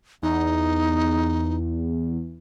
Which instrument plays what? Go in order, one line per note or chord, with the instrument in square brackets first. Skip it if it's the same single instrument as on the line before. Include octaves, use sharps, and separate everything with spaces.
[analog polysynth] E2 [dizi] D#4